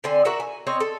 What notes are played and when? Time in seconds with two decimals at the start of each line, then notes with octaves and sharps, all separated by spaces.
0.04 D3 C4 D5 G#5
0.25 F#4 A#4 E5 F#5
0.40 G#5
0.67 C4 C#5 D#5
0.80 A4